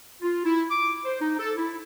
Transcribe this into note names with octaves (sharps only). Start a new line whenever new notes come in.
F4
E4
D6
C5
D#4
A4
E4